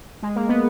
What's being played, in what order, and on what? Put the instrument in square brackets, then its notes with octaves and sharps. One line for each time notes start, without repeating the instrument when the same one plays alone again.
[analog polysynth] G#3
A#3
B3